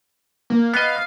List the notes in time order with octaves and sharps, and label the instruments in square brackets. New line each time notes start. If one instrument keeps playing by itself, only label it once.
[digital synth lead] A#3
[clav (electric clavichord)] B3 D#5 [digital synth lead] F5